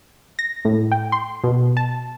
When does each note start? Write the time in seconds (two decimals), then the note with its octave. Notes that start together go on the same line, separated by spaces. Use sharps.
0.39 A#6
0.65 A2
0.92 G5
1.12 C6
1.44 B2
1.77 A5